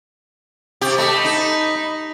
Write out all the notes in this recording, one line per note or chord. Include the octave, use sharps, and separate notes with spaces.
C3 G4
A3 D#5 B5
D#4